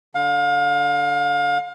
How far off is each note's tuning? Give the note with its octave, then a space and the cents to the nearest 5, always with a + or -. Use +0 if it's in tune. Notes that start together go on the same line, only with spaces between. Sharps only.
D3 -5 F5 +30